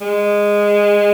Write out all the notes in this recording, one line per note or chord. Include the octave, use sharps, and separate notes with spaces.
G#3